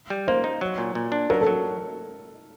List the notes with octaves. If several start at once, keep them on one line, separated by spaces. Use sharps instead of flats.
G3
A#3 C5
D#4
F#3
A#2
A#2
D4
F#3 A#4
A4
F#3